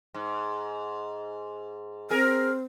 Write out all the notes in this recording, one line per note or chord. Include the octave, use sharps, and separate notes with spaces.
G#2
C4 G#4 A#4